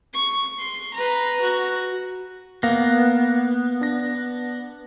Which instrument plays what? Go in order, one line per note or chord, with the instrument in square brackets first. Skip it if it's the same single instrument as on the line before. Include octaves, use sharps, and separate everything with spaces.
[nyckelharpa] C#6
C6
B4 A#5
F#4
[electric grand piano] A#3 F5 A#6 [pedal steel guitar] B3
[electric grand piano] D4 A#6